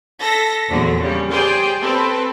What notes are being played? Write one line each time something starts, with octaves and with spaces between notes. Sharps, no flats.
A4 A#6 B6
E2 A#2 D3 F3 F#3
C#3 G3
G4 G#4 C5 D5 G5 C6
C4 A4 B4